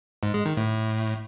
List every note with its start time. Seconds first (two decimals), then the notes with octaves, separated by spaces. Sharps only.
0.23 G#2
0.34 G#3
0.46 D#3
0.57 A2